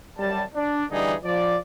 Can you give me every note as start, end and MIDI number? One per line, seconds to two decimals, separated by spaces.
0.17 0.43 42
0.17 0.43 55
0.17 0.43 81
0.54 0.83 62
0.90 1.14 50
0.90 1.14 52
0.90 1.14 55
0.90 1.14 62
0.90 1.14 63
0.90 1.14 68
1.24 1.56 53
1.24 1.56 74